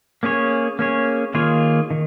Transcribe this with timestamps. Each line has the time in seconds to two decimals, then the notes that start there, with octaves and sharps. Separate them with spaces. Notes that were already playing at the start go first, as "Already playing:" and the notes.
0.23 A#3 C#4 G#4 C#5
0.79 A#3 C#4 G#4 C#5
1.34 D#3 A#3 F4 G#4 C#5
1.91 D#3